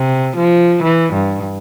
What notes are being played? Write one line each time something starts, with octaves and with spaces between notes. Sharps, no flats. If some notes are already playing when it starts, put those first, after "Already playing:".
Already playing: C3
F3
E3
G2